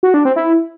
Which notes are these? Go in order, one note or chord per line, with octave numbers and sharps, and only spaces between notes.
F#4
D4
C4
E4